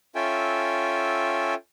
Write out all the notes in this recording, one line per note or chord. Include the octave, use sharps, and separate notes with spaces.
C#4 F4 A4 E5 G5 G#5